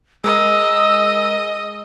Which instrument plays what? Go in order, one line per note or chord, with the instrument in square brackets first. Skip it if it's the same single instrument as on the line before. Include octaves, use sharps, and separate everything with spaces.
[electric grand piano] G#3 A#4 [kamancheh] D#5 [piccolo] E6